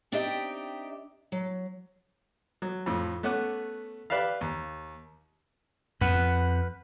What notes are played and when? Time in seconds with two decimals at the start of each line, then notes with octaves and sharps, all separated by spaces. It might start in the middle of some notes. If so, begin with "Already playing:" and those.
0.12 C4 D4 D#4 G4 D#5 E5
1.32 F#3
2.62 F#3
2.86 F2 A2
3.23 A3 B3 C#4 F#5 D6 F#6
4.10 G4 B4 D5 E5 F5
4.41 D#2
6.01 F2 B4 F#5